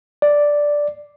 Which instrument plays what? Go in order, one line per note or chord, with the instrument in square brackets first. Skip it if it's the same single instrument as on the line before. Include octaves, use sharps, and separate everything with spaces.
[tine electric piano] D5